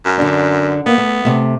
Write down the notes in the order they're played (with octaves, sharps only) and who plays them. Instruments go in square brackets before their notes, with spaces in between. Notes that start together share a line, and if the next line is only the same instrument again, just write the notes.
[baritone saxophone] F#2
[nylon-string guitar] D3 D4
[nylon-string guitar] A#3 [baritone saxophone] B3
[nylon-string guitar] A3
C3 A3